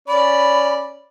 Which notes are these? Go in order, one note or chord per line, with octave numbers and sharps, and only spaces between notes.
C#4 D5 B5